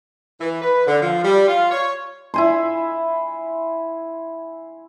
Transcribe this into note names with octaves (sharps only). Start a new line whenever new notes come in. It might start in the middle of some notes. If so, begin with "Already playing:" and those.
E3
B4
D3
F3
G3
F4
C#5
E4 G#5 C6